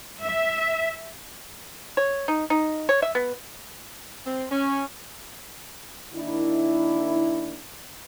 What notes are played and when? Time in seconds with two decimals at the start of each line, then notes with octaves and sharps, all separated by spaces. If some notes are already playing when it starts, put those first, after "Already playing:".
0.20 E5
1.97 C#5
2.28 D#4
2.50 D#4
2.89 C#5
3.02 E5
3.15 B3
4.26 C4
4.51 C#4
6.14 D#3 A#3 D4 E4